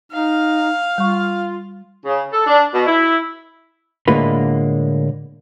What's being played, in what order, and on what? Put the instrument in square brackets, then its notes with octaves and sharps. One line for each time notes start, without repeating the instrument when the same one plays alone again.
[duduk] D#4 [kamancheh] F5
[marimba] G3 C#6 [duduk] F4
[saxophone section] C#3
A4
D4
B2
E4
[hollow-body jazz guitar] A2 D3 G#3 A#3 F4 B4